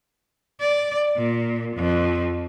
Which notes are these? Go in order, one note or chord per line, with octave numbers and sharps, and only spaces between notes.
D5
A#2
F2